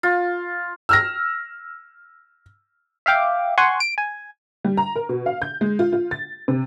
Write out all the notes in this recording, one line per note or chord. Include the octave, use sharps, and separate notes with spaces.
F4
E6 F6 A#6
E5 F5 G5 D6
F#5 G#5 C6 C#6
D7
G#5
G3
A#5
A#4
B2
F5
G6
G#3
F4
F4
A6
C3